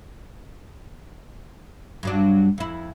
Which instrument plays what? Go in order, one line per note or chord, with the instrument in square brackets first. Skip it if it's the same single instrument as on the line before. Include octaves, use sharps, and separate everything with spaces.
[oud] G2 F#3 D4
F2 E4